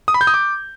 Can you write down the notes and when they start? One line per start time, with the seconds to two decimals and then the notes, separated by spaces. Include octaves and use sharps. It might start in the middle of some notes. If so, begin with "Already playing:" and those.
0.08 D#6
0.14 B5
0.21 G6
0.27 D#6
0.34 D6